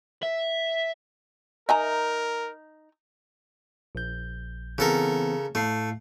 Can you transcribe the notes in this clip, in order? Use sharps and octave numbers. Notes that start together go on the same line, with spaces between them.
E5
D#4 A#4 E5 G#5 A#5
A#1 G6
C#3 E3 B3 C4 A4 A#4
A2 A3 F5 C7